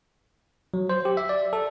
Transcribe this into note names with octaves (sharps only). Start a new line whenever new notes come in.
F#3
C5
G4
E5
D5
A4